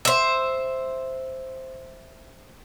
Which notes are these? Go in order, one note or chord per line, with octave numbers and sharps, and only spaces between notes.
C5 E5